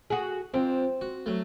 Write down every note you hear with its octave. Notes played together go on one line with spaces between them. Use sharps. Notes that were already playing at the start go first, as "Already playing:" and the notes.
F#4 G#4
F2 C4
F#4
F#3 A3